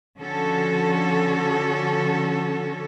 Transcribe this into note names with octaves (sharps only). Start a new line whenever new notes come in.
D3 F3 C#4 F#4 A4